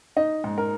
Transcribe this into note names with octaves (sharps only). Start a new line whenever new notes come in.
D#4 D#5
G#2
A#4